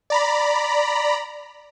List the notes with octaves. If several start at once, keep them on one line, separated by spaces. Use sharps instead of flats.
D5 A#5 B5